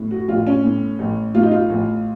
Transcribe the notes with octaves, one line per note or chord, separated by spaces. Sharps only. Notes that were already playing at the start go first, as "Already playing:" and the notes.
Already playing: A2
F#4
A1 F4
C#4
A2
A1
A2 F4
D#4
F4
A1